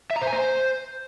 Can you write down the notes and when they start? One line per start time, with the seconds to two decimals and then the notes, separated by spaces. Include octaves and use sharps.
0.10 E5
0.16 A#5
0.22 C5
0.27 G#5
0.33 C5